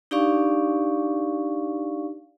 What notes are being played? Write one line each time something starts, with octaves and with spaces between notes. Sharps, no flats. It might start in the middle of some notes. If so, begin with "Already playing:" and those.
D4 D#4 G4 D5 F5 C#6